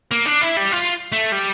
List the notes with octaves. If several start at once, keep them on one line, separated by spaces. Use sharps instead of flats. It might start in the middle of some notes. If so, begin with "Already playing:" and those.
A#3
D4
E4
G3
F4
A3
G3